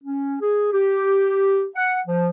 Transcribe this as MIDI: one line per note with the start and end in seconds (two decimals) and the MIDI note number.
0.03 0.36 61
0.41 0.72 68
0.73 1.66 67
1.76 1.98 78
2.06 2.29 53